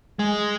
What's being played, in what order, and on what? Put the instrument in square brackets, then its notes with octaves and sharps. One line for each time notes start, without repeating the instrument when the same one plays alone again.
[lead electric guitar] G#3